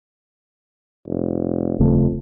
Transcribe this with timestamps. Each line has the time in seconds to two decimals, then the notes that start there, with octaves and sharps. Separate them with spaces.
1.07 F1
1.80 D#1 F2 C#3 A3